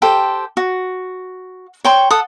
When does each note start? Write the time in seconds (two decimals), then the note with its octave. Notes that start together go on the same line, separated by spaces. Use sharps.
0.02 G4 A4 C5 G5
0.57 F#4
1.85 C#5 G5 C6
2.10 A4 F#5 D#6